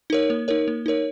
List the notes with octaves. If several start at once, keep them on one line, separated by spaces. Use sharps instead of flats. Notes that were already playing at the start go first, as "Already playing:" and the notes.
D#4 A#4 C#5
A#3
D#4 A#4 C#5
A#3
D#4 A#4 C#5